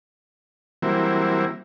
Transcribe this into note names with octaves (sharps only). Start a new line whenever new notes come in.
E3 F#3 G3 A#3 C4 E4